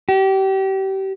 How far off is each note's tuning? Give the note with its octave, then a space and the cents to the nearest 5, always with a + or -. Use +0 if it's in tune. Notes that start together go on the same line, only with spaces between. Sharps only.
G4 -30